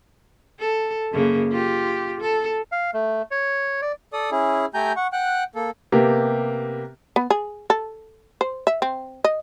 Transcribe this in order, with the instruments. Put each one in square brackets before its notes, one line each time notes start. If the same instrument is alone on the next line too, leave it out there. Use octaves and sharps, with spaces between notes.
[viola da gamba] A4
F#2 C#3 A#3
F4 G4
A4
[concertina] F5
A3
C#5
D5
[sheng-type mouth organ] A4 D5 D#6
C#4 E4 G#4
A3 G4 G#5 A#5 G6
F#5 C#6
F#5 G5 F#6
A#3 A4
[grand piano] C3 A#3 B3 G4
[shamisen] B3
G#4
A4
C5
E5
C4
D#5